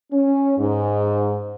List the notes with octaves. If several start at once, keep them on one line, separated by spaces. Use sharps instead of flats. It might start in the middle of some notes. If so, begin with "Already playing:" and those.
C#4
G#2